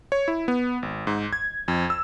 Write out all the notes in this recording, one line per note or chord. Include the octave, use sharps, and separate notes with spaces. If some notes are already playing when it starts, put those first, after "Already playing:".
C#5
E4
B3
G#1
G#2
G#6
F2
E6